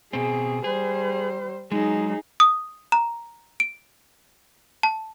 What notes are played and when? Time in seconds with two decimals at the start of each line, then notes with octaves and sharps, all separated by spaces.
0.13 B2 C4 G#4
0.64 G3 G#4 C5
1.72 F#3 G#3 D#4 G#4
2.40 D#6
2.92 A#5
3.60 D7
4.83 A5